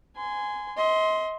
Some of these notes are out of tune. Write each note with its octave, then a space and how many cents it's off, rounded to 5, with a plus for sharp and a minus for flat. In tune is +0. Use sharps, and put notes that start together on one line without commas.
G#5 +0 C6 -25
D#5 +35 C6 +0